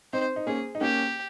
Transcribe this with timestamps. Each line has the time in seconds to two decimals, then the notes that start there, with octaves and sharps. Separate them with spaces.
0.13 C4 D#4 C5
0.36 D#4
0.47 A#3 C#4 G#4
0.75 D#4
0.81 A#3 C#4 G4